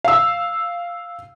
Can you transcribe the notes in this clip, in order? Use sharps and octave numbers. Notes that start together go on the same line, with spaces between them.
F5 E6